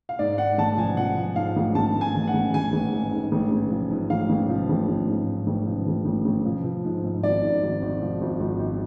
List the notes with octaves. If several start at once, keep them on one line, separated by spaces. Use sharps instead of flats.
F5
G#2 D5
G#2 F#5
A1 A5
F3 G#5
F3 F#5
F3
G#2 F5
A1
A1 A5
A1
G#5
A1
F#5
A1
A1 G#5
A1
G#2
G#2
A1
A1
F3
G#2
A1 F5
A1
F3
A1
A1
G#2
G#2
A1
F3
A1
A1
A1
F3
F3
G#2
G#2
G#1 D5
G#2
G#1
G#1
F3
G#1
G#1
G#1